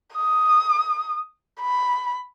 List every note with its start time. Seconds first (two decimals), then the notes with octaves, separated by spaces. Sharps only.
0.14 D#6
1.61 B5